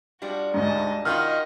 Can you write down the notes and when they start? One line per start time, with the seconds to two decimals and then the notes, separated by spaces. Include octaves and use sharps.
0.22 F3 G3 D4 F#4
0.54 D2 G#2 D#5 A5
1.05 D#3 D#4 F4 F#4 D#5 F6